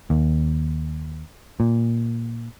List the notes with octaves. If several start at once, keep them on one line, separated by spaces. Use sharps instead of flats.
D#2
A#2